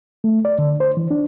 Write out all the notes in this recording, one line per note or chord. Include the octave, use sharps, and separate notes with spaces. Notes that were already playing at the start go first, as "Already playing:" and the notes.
A3
D5
D3
C5
E3
D4